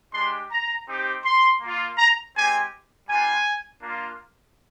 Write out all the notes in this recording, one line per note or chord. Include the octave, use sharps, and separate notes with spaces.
G#3 D4 G4 C6
A#5
C4 D#4 G4
C6
A#3 F4
A#5
G#3 C4 G4 G#5
G3 D4 F4 G#5
A#3 D4 F4